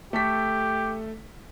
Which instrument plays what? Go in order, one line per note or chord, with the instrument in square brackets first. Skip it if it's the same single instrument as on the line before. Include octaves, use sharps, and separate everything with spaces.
[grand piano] A3 A4 B6 [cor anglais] G4